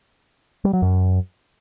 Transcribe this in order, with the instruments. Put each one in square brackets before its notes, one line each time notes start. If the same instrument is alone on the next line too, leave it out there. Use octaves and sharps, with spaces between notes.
[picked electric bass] G3
F#3
F#2